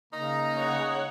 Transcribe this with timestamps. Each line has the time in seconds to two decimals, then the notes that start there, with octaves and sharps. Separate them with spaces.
0.13 C#3 A#3 D#4 A#5
0.56 C#5 F#5